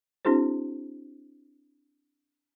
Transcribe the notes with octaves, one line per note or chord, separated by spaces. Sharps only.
C4 D4 E4 F#4 G#4 C5